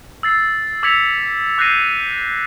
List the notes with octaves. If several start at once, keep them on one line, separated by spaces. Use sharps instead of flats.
E6 A6 C7
D6 E6 G#6 B6 C#7 F7
D6 F#6 G6 A#6 C7 D#7